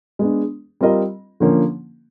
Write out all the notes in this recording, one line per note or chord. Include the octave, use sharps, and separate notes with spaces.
G#3 B3 D4
G3 C4 F4 A#4 D#5
D3 F3 A#3 C#4